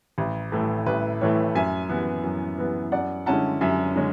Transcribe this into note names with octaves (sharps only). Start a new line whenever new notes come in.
A1
A2 E3 A3
A1 B4
A2 E3 A3 C#5
F#2 E5 G#5
E3 B3
F#2
E3 B3
F#2 D5 F#5
D3 G#3 C#4 E4 F#5 A5
F#2 E5 G#5
D3 G#3 C#4